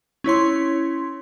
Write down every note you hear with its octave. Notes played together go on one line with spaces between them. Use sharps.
C#4 E4 C#5 C6